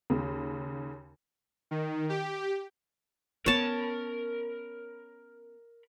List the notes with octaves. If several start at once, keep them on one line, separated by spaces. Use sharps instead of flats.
D#2 C#3
D#3
G4
B3 C#4 A#4 C#5 A5 B5